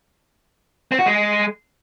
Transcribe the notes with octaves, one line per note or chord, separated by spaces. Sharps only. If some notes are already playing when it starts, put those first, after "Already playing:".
C4
F#4
G#3